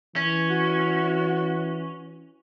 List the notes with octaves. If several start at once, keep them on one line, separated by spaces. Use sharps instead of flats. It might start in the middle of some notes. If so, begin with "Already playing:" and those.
E3 C#4
F#4